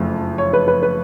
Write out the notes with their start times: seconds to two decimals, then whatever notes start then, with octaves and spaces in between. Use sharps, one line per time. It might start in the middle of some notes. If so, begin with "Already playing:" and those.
Already playing: F#1 F2 F3 A3
0.38 C#5
0.53 B4
0.68 B4
0.83 B4